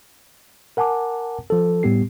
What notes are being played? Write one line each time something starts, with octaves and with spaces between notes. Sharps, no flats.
A#4 F#5 G#5 A5 D6
F3 A4
A2 G3 B3 G4 C7